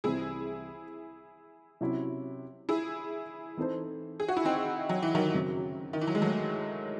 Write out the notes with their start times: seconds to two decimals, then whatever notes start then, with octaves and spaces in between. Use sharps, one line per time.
0.04 C2 C3 E3 C4 E4 G#4
1.81 C3 F#3 C#4 E4
2.69 E4 G#4
3.57 E3 C4 D#4 A4 C5
4.20 G#4
4.28 F#4
4.37 E4
4.45 C4 D#4
4.89 F#3
5.02 E3
5.15 D#3 F#3
5.34 F#2 C#3 F#3 C4 F#4
5.93 D#3
6.01 E3
6.07 F#3
6.15 G#3
6.22 F#3 A3